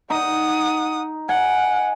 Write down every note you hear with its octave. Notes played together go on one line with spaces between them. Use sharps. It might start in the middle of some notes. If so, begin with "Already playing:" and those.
D#4 F#5 D#6
F#5 G#5